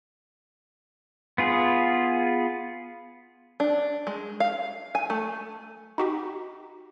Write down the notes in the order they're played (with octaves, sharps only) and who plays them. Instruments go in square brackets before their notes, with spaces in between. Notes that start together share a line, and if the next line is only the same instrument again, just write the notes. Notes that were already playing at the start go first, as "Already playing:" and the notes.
[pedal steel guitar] B3 F4 G#4
[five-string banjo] D4
G#3
F5
G#5
A3
[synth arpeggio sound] D#4 F#4 G4